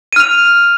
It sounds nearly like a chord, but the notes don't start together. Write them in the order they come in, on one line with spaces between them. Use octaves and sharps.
D#7 F6 F7